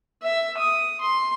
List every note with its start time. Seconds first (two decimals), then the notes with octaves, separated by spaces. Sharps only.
0.23 E5
0.58 D#6
1.01 C6